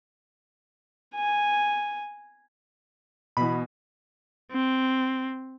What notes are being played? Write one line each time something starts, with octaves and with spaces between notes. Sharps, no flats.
G#5
B2 E3 B5
C4